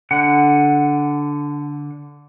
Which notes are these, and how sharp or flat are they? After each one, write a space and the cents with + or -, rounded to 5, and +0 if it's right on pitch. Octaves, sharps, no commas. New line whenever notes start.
D3 -10 F#5 +0